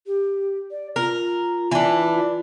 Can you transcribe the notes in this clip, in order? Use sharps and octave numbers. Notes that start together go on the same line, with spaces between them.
G4
D5
F4 A#4
E3 D4
F4